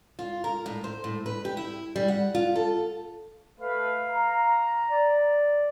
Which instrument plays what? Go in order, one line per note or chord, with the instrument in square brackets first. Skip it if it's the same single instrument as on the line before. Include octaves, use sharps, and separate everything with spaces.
[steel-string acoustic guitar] F4
A#4
A2
C5
A2
B4
G4
E4
G3
F#5
F4
A4
[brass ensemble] A3 B4 [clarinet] F5
[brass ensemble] A#5
[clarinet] D5